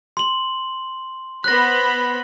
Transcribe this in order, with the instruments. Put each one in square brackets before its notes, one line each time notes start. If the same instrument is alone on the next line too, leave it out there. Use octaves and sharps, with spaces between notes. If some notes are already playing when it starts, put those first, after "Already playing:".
[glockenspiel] C6 F#7
[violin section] B3 C5 B5 [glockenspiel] F#6 A#6